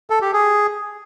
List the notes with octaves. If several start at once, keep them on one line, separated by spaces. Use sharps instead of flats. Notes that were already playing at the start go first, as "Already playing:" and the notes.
A4
G4
G#4